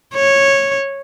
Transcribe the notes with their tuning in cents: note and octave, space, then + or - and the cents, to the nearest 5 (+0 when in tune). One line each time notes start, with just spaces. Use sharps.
C#5 -10